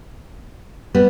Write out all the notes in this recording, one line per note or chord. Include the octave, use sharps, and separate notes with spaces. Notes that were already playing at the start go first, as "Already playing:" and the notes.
G3 B3